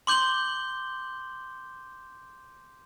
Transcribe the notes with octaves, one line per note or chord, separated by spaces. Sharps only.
C6 D6 G6 F#7 G7